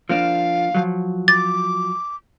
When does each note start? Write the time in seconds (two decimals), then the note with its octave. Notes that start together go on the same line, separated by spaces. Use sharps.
0.09 F3 A#3 D4 F5
0.74 F3 F#3
1.28 D6 A6